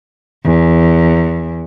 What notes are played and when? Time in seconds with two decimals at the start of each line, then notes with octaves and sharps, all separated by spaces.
0.43 E2